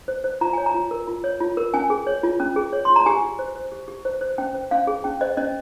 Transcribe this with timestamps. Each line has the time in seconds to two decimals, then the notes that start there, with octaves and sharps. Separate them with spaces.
0.08 C5
0.24 C5
0.41 F4 A#5
0.53 C#5 G#5
0.66 A#5
0.74 F4
0.91 A#4
1.07 F4
1.24 C#5
1.40 F4
1.57 A#4
1.74 C#4 G#5
1.90 G#4
2.07 C#5
2.23 F4
2.40 C#4
2.56 G#4
2.73 C#5
2.85 F4 C6
2.96 A#5
3.06 G4 G#5
3.23 G4
3.39 C5
3.55 C5
3.72 G4
3.88 G4
4.05 C5
4.21 C5
4.38 C#4 G5
4.54 C5
4.71 C#4 F5
4.87 G#4
5.04 C#4 G5
5.21 C5 D#5
5.37 C#4 D#5